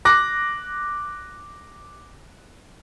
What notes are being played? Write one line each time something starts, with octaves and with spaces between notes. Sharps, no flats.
D6 F#6 A#6